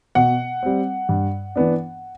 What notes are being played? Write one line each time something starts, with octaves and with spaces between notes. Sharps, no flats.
B2 F#5
G3 C4
G2
E3 B3 D4